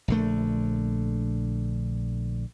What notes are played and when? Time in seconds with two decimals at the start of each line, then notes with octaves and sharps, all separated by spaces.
0.08 A#1 D3 A3